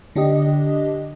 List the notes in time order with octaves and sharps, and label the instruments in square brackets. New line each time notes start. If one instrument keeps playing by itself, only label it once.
[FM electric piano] D3 D4 G4 D#5